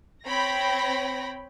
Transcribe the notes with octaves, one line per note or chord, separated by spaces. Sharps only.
C4 C#5 G5 B5 A#6